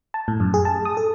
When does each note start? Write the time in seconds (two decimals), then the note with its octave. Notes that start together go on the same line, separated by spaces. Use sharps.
0.14 A5
0.28 A2
0.40 F#2
0.54 G#4
0.65 A5
0.85 D#6
0.97 A4